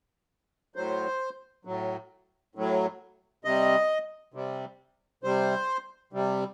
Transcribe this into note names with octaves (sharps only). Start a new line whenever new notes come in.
A2 F#3 C5
A2 F#3
A2 F#3
C3 G3 D#5
C3 G3
C3 G3 C5
C3 G3